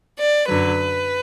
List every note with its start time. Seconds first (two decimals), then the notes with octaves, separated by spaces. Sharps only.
0.18 D5
0.47 F#2 D3 F#3 B4